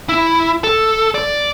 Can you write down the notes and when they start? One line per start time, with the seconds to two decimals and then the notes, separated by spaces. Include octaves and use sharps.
0.09 E4
0.64 A4
1.15 D5